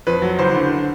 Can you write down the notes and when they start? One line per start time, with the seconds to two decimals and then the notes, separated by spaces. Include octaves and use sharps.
0.07 F2 B4
0.22 F#3
0.39 F#1 C5
0.55 D3